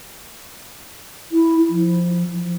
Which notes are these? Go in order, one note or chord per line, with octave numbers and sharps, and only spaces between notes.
E4
F3